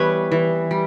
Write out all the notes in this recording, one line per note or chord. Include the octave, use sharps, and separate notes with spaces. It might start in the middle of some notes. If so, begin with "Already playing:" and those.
Already playing: E3 G3 B3 B4 C#5
E3
G3